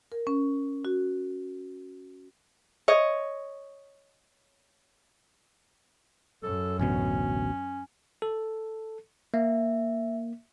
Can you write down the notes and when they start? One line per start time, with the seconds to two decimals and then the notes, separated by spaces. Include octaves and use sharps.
0.12 A#4
0.27 C#4
0.85 F#4
2.88 C#5 D#5
6.43 F#2 A4
6.79 A1 D2 B2 C#4
8.22 A4
9.34 A#3 E5